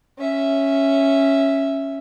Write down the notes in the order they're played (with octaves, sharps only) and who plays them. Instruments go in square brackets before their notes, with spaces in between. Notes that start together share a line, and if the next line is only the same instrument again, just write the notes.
[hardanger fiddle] C#4 E5